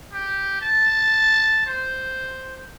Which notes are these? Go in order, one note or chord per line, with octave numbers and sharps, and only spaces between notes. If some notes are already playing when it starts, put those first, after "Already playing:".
G4
A5
C5